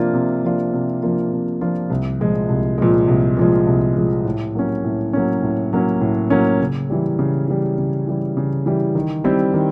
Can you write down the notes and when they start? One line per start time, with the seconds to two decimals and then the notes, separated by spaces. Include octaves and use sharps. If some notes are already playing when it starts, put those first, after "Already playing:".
Already playing: C3 F3 A#3 D4 F4
0.14 C3
0.43 F3 A#3 D4 F4
0.73 C3
1.02 F3 A#3 D4 F4
1.32 C3
1.61 F3 A#3 D4 F4
1.90 C2
2.20 A#2 F3 G#3
2.49 C2
2.78 A#2 F3 G#3
3.08 C2
3.37 A#2 F3 G#3
3.67 C2
3.96 A#2 F3 G#3
4.25 A2
4.55 F#3 A#3 C#4
4.84 A2
5.13 F#3 A#3 C#4
5.42 A2
5.73 F#3 A#3 C#4
6.01 A2
6.30 F#3 A#3 C#4
6.61 C#3
6.90 E3 G3
7.19 C#3
7.48 E3 G3
7.78 C#3
8.07 E3 G3
8.37 C#3
8.66 E3 G3
8.95 D#3
9.24 G3 C4 E4
9.54 D#3